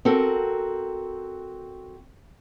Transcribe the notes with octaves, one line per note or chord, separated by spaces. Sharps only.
C4 F#4 A4 A#4